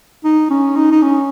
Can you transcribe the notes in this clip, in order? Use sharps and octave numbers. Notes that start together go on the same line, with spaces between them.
D#4
C#4
D#4
D#4
C#4